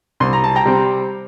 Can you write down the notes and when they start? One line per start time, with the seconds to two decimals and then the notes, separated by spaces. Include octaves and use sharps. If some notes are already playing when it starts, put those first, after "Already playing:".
0.20 C2 C6
0.33 A#5
0.44 A5
0.56 G5 A#5
0.65 C3 G3 C4